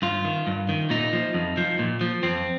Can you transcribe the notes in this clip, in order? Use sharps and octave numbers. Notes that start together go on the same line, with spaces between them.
G2 F4
D#3
G2
D#3
A#2 D#4
F3
F2
F3
A#2
F3
F2 C4